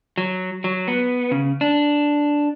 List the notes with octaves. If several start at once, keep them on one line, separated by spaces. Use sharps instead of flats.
F#3
F#3
B3
C#3
D4